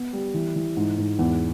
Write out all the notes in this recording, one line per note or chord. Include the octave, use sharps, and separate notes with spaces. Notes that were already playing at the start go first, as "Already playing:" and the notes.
Already playing: B3
G3
E3
E3
G#2
G#2
E2